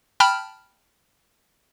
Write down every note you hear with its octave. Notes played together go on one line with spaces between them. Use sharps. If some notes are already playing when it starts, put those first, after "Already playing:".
G5 A5 B5 F6